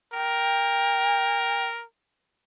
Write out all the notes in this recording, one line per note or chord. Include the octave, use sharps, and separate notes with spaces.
A#4 G5